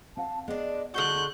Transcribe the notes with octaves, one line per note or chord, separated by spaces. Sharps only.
C4 F5 F#5 A5
G#3 B3 D4 D#5
D3 G#3 F#4 C#6 F#6 G6